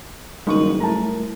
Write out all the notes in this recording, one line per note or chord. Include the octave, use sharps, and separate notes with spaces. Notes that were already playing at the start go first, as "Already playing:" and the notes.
F#1 D#3 G3 G#3 A#3 D#4 A#4 C#6
A3 E4 A5 A#5